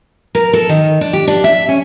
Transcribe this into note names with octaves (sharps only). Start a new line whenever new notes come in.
A#4
A4
D#3
D4
G4
D4
E5
C#4